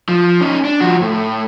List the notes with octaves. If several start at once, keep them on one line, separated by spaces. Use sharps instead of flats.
F3
C#4 D#4
D4
F3 F#4
A2